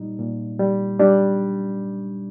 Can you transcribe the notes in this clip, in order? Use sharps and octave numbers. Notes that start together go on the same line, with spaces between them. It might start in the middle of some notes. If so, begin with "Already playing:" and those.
Already playing: A#2 G3 D#4
A#2
G3
G3 D4